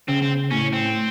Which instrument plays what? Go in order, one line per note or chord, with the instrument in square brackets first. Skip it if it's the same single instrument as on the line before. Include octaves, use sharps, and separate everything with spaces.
[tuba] C#3 [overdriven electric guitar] C4
[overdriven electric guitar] C4
[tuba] A2 [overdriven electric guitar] C#4
[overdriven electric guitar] C4